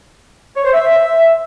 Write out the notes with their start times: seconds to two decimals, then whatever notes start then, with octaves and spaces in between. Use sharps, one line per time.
0.56 C#5
0.65 C5
0.73 E5